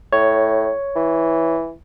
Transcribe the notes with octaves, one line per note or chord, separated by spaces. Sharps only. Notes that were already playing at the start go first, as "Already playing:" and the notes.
A2 C#5
E3